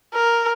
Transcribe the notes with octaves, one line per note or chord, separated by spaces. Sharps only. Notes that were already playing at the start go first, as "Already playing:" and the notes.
A#4